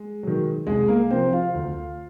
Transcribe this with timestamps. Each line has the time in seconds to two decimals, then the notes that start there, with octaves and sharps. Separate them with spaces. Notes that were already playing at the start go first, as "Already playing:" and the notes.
Already playing: G#3
0.23 D#3 F#3
0.67 C2 G#3 G#4
0.88 A#3 A#4
1.10 C3 F3 C4 C5
1.32 F4 F5
1.54 D2